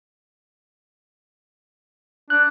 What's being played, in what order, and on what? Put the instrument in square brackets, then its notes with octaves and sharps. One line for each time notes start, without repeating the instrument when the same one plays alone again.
[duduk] D4 [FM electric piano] F#6